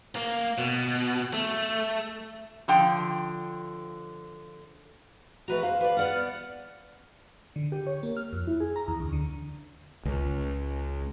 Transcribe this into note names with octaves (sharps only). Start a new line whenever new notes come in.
A#3
B2
A3
D3 F3 G5
A3 F#4 B4 A#5
C5 F5
B4 D5
B3 D5 F#5 F6
D3
G4
C#5
A#3
F6
F2
E4
G#4
A#5
E2
D2
D3
C#2